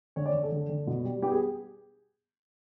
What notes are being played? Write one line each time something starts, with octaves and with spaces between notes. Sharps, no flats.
D3 C#5
D5
D3
A4
D3
D3
B2
G3
B3 G4
G#4